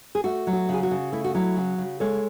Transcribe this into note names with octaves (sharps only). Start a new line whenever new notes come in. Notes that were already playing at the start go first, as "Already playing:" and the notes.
G#4
A3 F#4
F#3
F#4
C#3 G#4
F#4
C#3
A3 E4
F#4
F#3 E4
C#3 F#4
C#3
G#3 A4 C#5